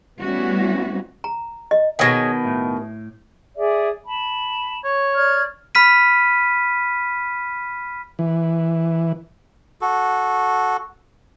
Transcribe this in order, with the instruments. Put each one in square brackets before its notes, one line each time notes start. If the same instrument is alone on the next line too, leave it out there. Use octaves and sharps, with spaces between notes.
[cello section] G3 A3 B3 C#4 E4 F#4
[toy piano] A#5
D#5
[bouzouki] B2 D#3 [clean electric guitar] G#4 C#5 D#5
[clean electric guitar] A2
[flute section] G#4 D5 E5
A5 B5
[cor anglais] C#5
[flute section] D5 F6 G#6
[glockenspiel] B5 F6 B6 D#7
[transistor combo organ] E3
[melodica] F#4 A4